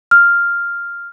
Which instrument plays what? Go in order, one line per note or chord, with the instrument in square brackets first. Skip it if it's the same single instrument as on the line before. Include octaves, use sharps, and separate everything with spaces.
[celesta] F6